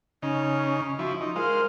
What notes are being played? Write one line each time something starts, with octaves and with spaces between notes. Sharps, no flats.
C#3 C#4 D#4
F3 E4 F#4
D#4 F4
G#3 A#4 C5 F5